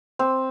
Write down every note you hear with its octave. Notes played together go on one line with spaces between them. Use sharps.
C4